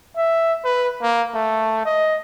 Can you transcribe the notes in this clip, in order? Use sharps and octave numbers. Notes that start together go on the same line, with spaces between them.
E5
B4
A#3
A3
D#5